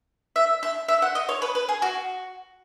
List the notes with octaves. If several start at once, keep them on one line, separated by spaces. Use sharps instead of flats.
E5
E5
E5
F#5
D#5
C#5
B4
B4
G#4
F#4